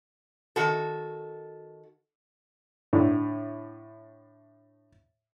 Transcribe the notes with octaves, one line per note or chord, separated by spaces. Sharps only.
D#3 F#4 A4
A2 D3